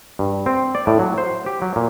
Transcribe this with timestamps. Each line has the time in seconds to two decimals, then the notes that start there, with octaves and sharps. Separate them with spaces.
0.19 G2
0.46 C4
0.75 D5
0.87 A2
0.99 F#3
1.18 C5
1.46 G4
1.62 F#3
1.76 A#2